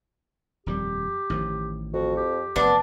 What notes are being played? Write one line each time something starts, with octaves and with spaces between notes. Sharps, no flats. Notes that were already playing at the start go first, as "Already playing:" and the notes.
D#1 F2 G3 G4
A1 D#3 F3
F2 F#4
G4
F1 F#2 B3 D4